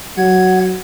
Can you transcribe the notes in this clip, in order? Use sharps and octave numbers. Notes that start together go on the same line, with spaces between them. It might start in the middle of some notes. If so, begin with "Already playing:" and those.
F#3 F#5 G#6